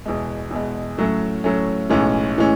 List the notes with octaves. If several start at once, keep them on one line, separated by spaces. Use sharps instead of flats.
E2 B2 G#3
E2 B2 G#3
A2 F#3 A3 C#4
A2 F#3 A3 C#4
B1 A2 E3 G#3 C#4
A2 E3 G#3 C#4